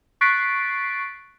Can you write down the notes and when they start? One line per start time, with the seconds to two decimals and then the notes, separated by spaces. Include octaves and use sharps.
0.21 C#6 F#6 A6 B6 C7 D7